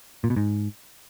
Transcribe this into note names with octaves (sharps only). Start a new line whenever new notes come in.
A#2
B2
G#2